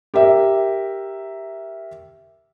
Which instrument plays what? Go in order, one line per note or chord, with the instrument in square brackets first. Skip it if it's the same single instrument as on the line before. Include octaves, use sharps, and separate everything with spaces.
[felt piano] G4 A#4 E5